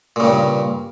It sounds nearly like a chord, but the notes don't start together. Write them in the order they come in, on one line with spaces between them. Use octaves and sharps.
A#2 C#3 G2